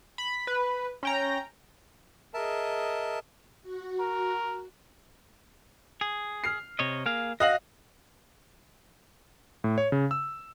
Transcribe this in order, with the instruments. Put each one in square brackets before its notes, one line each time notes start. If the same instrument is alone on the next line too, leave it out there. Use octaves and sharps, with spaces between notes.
[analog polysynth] B5
B4
C#4 G5 A#5
[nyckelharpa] G#4 D#5 [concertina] A#4 E5 A5
[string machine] F#4
[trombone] A#4
[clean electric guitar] G#4
[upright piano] F6 C7
[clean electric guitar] C3 C#5 D#5
A#3 G#4 F5
[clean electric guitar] F#4 [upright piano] D#5 F5 F#7
[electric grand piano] A2
C#5
C#3
E6